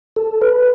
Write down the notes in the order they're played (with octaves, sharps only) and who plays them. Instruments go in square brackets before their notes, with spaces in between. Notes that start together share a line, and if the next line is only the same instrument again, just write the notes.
[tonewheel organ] A4
B4